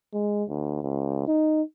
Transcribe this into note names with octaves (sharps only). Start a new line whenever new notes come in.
G#3
D2
C#2
D#4